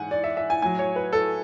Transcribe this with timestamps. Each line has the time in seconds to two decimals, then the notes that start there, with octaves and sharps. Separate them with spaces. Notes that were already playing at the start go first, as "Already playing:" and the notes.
Already playing: G#2 E3 F#5 G#5
0.11 D5
0.24 E5
0.37 E5
0.50 G#5
0.62 A2 F#3 G#5
0.79 C#5
0.96 B4
1.13 A4